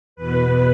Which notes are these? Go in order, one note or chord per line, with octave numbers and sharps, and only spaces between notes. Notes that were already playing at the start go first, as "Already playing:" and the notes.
E2 B2 B4